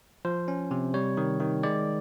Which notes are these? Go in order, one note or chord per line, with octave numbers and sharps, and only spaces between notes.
F3 C5
C#4
C3
G3 C#5
D#3
D#3
G#3 D5